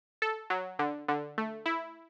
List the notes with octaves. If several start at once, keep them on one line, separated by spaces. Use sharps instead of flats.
A4
F#3
D3
D3
A3
E4